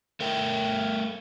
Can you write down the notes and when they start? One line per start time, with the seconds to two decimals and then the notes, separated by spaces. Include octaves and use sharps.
0.20 A3 A#4 G5